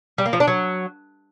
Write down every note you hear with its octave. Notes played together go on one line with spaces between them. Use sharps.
G3
A#3
F3
D4
F#3